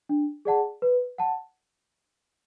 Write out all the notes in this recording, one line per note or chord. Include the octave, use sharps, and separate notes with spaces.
D4
G#4 D5 F#5 A5
B4
F#5 A5